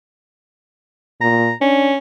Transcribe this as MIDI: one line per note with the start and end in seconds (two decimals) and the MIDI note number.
1.21 1.52 46
1.21 1.53 82
1.61 1.97 61
1.61 1.91 62